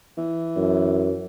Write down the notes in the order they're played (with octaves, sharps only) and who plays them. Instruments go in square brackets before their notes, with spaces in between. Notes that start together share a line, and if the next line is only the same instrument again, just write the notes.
[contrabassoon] E3
[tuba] F#2